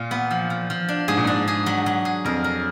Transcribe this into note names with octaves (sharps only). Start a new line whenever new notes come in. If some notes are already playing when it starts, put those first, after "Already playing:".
Already playing: A#2 F4
B3
F3
F3
F3
D4
G#2 G#4
A#2
G#2 D4
G#4
F#3
F#3
G#4
F2 A#4
A#4